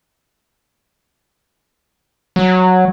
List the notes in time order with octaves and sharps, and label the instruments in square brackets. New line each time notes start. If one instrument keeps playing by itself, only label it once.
[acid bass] F#3